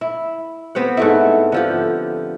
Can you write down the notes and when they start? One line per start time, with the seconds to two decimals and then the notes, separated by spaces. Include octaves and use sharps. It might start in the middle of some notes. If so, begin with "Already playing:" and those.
0.01 E4
0.75 B3 C4 G4 F#5
0.97 G#2 A3 E4
1.52 D3 F3 G4